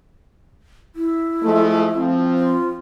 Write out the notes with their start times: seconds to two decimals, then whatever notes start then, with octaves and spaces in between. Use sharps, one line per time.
0.96 E4
1.43 F3 G#3 A3
1.97 F3 C4
2.37 F4